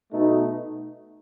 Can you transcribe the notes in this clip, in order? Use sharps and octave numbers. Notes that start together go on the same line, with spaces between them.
B2 A3 D#4